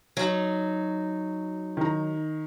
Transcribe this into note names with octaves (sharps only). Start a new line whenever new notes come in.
F#3 D#4
D#3 A#5